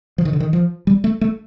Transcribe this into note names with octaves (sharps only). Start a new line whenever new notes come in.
F3
D#3
D3
D#3
F3
G3
A3
A3